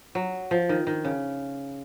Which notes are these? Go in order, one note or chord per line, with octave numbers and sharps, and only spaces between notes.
F#3
F3
D#3
D#3
C#3